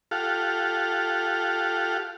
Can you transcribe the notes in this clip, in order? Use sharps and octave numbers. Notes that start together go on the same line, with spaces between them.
F4 G4 A4 F5 F#5